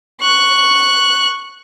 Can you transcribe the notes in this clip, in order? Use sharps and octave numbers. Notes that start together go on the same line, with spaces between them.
C#6 F#6